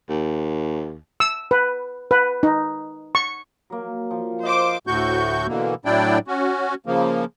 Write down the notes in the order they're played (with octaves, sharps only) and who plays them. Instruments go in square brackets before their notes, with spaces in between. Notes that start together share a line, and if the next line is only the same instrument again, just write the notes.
[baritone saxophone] D#2
[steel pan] E6
B4
B4
D#4
C#6
[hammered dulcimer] F#3 A#3
F3
[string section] C5 D6 [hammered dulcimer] D#5 F5
[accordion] D2 A2 A3 F#4 C#6 G6
B2 D3 E3 A#3
A2 F#3 D4 E4 D5 G5
C#4 F#4
C#3 F3 A#3